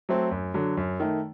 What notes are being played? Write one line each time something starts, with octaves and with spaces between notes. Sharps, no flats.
F#3 A3 C4
F#2
D3 F#3
F#2
D#3 A3